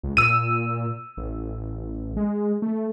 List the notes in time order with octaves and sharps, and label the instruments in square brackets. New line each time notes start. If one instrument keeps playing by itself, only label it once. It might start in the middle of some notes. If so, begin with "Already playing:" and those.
[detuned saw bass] C#2
[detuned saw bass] A#2 [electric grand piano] E6 D#7
[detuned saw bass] A1
G#3
A3